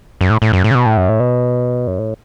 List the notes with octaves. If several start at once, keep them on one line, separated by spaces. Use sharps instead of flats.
F#2
A2
A2
F#2
A2
C#3
B2
A2
F#2
A2
B2
F#2
A2